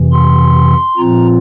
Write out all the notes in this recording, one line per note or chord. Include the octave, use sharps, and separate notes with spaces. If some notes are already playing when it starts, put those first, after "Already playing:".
Already playing: F2 C3 E3
C6
A#2 F3 C4 F4 A#5